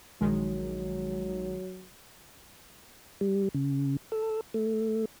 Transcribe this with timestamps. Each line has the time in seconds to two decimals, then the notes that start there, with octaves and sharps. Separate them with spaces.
0.21 A#1 D#3 F#3 G#3
3.21 G3
3.54 C#3
4.12 A4
4.54 A3